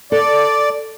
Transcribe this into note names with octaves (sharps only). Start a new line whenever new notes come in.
A4 D5